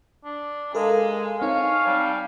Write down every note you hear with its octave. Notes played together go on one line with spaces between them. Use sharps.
D4
G#3 A4 A#4 D#5 F5 G#5
C4 D#4 C#5 F5 G#5 A5
G3